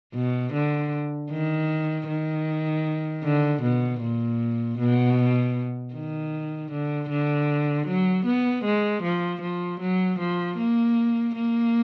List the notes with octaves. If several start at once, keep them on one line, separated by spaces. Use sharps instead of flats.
B2
D3
D#3
D#3
D3
B2
A#2
B2
D#3
D3
D3
F#3
B3
G#3
F3
F3
F#3
F3
A#3
A#3